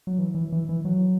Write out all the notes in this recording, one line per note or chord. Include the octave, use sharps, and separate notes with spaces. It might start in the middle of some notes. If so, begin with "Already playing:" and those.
F#3
E3
E3
E3
E3
F#3